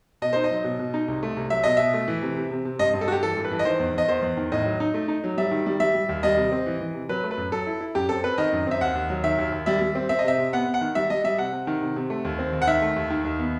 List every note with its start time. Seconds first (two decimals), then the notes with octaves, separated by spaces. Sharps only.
0.22 B2 D#5
0.33 D#4 C5
0.44 D#5
0.51 F#3
0.64 B2
0.79 B2
0.94 D#4
1.08 C2
1.23 A3
1.36 C2
1.50 F#3 E5
1.64 B2 D#5
1.77 B2 E5
1.94 A3
2.08 E3
2.22 C3
2.36 C3
2.51 C3
2.65 C3
2.79 G2 D#5
2.94 G2
3.01 A4
3.08 G2 F#4 G4
3.22 E3 A4
3.37 G2
3.44 B4
3.51 E3
3.59 D#5
3.65 D#3 C5
3.80 E2
3.94 E2 D#5
4.08 E2 C5
4.23 E2
4.37 D#3
4.52 A2 D#5
4.65 F#3
4.80 D#4
4.94 A3
5.08 D#4
5.24 F#3
5.37 G3 E5
5.51 D#3
5.66 G3
5.80 G3 E5
5.94 G3
6.09 D#2
6.23 G3 D#5
6.37 C3
6.52 C4
6.66 E3
6.80 E3
6.94 C3
7.09 F#3 B4
7.24 A3
7.31 B4
7.37 F#2
7.52 F#3 A4
7.67 E4
7.81 E4
7.95 F#2 G4
8.09 C4 A4
8.24 C4 B4
8.38 D#3 D#5
8.52 F#2
8.67 C4 E5
8.81 D#2 F#5
8.95 D#2
9.10 F#3
9.24 D#3 E5
9.38 D#2
9.52 D#2
9.66 G3 E5
9.81 G3
9.95 C4
10.09 C4 E5
10.19 D#5
10.24 C3 E5
10.38 C3
10.53 B3 F#5
10.67 B3
10.74 F#5
10.81 D#3
10.95 G3 E5
11.10 G3 D#5
11.24 G3 E5
11.38 C3 F#5
11.53 C3
11.67 D#3
11.82 C3
11.96 C3
12.10 A3
12.25 D#2
12.39 C4
12.53 D#2
12.62 F#5
12.67 D#3 E5
12.82 A3
12.96 D#2
13.10 D#3
13.25 D#2
13.39 B3